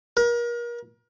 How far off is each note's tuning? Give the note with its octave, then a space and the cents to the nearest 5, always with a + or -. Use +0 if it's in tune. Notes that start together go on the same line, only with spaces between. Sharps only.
A#4 +35